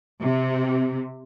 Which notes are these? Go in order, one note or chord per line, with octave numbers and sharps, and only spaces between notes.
C3